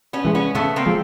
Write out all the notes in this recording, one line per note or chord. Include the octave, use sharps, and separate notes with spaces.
B3 C#4
E3 G#3
B3 C#4
C#3 A3 B3
A#3 C4
F3 G#3